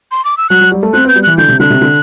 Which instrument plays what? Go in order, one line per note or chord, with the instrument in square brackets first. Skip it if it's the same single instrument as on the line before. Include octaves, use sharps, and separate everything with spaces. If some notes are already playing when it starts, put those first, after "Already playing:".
[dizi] C6
D6
E6
[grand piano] F#3 [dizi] F#6
[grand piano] F#3
G3
A3
[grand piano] C4 [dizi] F#6
[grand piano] B3 [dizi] G6
[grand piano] G3
[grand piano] E3 [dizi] F#6
[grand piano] D3 [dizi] G6
[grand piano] C3
[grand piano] D3 [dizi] F#6
[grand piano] C3
D3